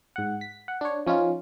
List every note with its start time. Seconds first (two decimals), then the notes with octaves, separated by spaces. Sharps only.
0.16 G#2 F#5
0.41 B6
0.68 F#5
0.81 D4 C#5
1.06 F3 C#4 D#4 F4